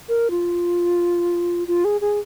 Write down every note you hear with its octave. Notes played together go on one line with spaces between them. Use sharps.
A#4
F4
F4
G#4
G#4